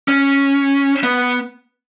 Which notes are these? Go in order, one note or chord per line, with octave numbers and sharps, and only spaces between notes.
C#4
B3